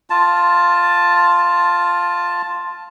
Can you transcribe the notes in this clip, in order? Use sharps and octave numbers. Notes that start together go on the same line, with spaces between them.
F4 A5